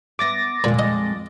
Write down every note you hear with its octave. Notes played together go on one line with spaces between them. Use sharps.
B3 E5 D6 A6 A#6
F2 A#2 G#3
D#5